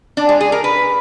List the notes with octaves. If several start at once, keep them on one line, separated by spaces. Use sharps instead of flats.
D4
G#3
G#4
A#4
B4